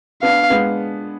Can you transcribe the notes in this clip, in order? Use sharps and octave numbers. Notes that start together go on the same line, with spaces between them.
B3 D4 F5
G#3 B3